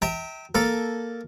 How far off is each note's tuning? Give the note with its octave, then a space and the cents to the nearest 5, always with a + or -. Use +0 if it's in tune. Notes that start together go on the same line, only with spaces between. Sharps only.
E5 -35 G5 -5 A#5 -35
A#3 +0 A4 +0